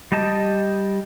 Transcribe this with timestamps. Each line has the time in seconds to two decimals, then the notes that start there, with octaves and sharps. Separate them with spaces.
0.12 G3 G4 D#5 A5